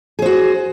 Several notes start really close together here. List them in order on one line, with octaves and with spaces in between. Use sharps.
G#4 C5 F#4